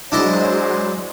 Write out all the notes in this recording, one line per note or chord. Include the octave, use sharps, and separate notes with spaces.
F#3 G#3 D4 E4 C5 D#5